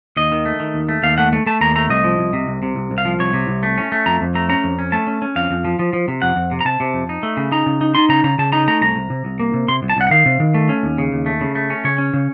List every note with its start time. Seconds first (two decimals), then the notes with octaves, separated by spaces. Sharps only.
0.17 D#2 D#5
0.32 D#3
0.45 A3
0.60 D#3
0.74 D#2
0.89 A3
1.03 D#2 F5
1.18 A3 F#5
1.33 A3
1.46 A3 A5
1.61 D#2 A#5
1.75 A3 A#5
1.90 C2 D#5
2.04 F3
2.19 C2
2.33 C3
2.48 C2
2.63 C3
2.76 C2
2.91 C2
2.98 F5
3.05 F3
3.20 C2 C#5
3.33 C3
3.48 C2
3.63 A3
3.78 C#4
3.92 A3
4.06 F2 A#5
4.21 F2
4.35 A3 A#5
4.49 C#4 A#5
4.64 F2
4.79 C#4
4.92 A3 A5
5.07 C#4
5.22 C#4
5.36 F2 F5
5.51 F2
5.65 F3
5.79 F3
5.93 F3
6.08 C3
6.22 F2 F#5
6.36 F2
6.51 C3
6.61 A#5
6.65 C3 A5
6.80 C3
6.94 F2
7.09 D#4
7.23 A3
7.37 C#3
7.52 D#4 A#5
7.66 C#3
7.81 D#4
7.95 D#4 C6
8.09 C#3 A#5
8.24 C#3 A#5
8.39 C#3 A5
8.52 D#4 A#5
8.68 A3 A#5
8.81 C2 A#5
8.96 C2
9.10 C3
9.25 C2
9.40 A#3
9.54 C3
9.68 C3 C6
9.83 C2
9.90 A5
9.97 C2 F#5
10.07 F#5
10.11 D#3 F5
10.26 C3
10.40 D#3
10.54 A3
10.69 C#4
10.83 D#2
10.98 C#3
11.13 D#2
11.26 A3
11.41 C#3
11.55 A3
11.70 C#4
11.84 C#3 C#5
11.98 C#4
12.14 C#3